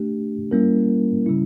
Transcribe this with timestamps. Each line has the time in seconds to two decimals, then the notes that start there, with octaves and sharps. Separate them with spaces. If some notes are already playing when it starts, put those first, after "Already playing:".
Already playing: A3 D4 G4
0.51 G3 A#3 C#4 E4 A#4
1.26 C#3 G3 C#4 E4